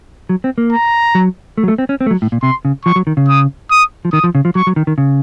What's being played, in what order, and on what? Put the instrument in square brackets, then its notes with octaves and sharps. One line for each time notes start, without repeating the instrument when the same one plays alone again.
[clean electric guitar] F#3
C4
A#3
[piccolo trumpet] A#5
[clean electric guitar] F#3
A3
F#3
A3
C4
C#4
C4
A3
F#3
A2
A#2
[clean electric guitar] C3 [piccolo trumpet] C6
[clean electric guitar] C#3
[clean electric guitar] F3 [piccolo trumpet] C#6
[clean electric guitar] F#3
D#3
C#3
[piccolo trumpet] D#6
D#6
[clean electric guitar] F3
[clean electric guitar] D#3 [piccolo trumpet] D#6
[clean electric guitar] F3
C#3
F3
[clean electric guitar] F#3 [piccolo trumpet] C#6
[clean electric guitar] F#3
D#3
D#3
C#3